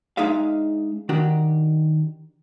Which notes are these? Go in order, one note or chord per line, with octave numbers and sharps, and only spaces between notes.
G#3 D4 D#4 G#4 E5 F5
D#3 D4 F#4 G4